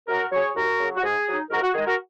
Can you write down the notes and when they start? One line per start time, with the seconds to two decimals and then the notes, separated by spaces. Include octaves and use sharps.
0.08 F#2 F#4 A#4
0.32 F#3 C#4 G#4 C#5
0.55 D#2 F#4 A#4
0.80 C#3 F#3
0.96 F#4
1.03 G#2 G#4
1.27 F#3 D#4
1.51 G#2 F#4 A#4
1.62 F#4
1.74 D#3 G#3 G#4
1.86 F#4 A#4